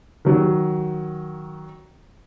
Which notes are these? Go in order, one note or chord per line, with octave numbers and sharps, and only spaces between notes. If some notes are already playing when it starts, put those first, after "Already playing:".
D#3 F#3